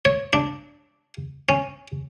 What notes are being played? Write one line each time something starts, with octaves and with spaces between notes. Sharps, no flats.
C#5
D4
C#4